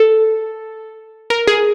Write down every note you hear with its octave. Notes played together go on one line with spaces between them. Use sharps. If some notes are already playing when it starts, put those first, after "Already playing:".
Already playing: A4
A#4
G#4